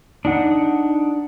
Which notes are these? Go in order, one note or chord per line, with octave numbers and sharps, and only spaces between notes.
D4 D#4 F#5